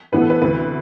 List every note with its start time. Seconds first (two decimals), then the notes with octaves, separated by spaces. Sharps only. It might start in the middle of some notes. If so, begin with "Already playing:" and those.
0.12 A2 E3 B3 B4
0.21 A4
0.30 B4
0.41 D2 C3 E3 B4